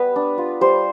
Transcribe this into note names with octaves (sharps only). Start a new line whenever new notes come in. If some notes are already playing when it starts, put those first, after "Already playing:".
Already playing: G3 B3 B4
D4
F4
G3 C5